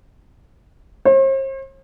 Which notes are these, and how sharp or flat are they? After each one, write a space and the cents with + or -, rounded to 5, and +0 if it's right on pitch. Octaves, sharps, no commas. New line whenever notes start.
C5 +45